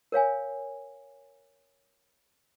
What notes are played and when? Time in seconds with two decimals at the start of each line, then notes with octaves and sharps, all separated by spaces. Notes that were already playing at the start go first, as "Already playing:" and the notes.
0.12 A#4 C#5 F5 G#5